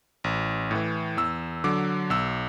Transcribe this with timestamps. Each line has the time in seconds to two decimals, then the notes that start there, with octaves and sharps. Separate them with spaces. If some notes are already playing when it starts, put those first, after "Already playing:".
0.24 A1
0.71 A2 E3
1.17 E2 E6
1.64 D3 F#3 D6
2.10 B1 E6